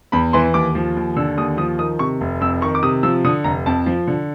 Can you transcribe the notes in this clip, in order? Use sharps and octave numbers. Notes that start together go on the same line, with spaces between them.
E2 B5
E3 C6
D#2 D6
F3
D#2
D3 E6
D#2 D#6
F3 D#6
D#3 D#6
C3 C#6
F1
F2 E6
D#3 C#6
D6
C3 D#6
F3 E6
D3 D#6
F1 A#5
F2 A5
F3
D3